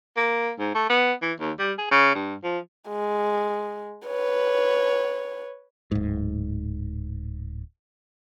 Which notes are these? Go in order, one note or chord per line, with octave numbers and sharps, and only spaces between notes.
A#3
G#2
A3
B3
E3
D#2
G3
G#4
C#3
G2
F3
G#3
B4 C#5
D1 G#2